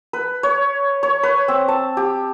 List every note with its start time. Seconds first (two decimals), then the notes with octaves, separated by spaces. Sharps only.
0.13 B4
0.43 C#5
1.03 C#5
1.23 B4
1.48 C4
1.68 A5
1.97 G4